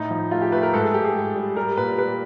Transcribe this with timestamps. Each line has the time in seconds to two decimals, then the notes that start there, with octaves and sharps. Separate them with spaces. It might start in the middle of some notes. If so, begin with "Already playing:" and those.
Already playing: A2 D#4
0.10 F3
0.31 A3 F4
0.42 G4
0.52 A3 B4
0.63 A#4
0.73 G#2 A4
0.83 G#4
0.94 G#2 G4
1.04 G#4
1.15 G#2
1.36 G3
1.56 G3 A#4
1.77 A#2 B4
1.98 G3 B4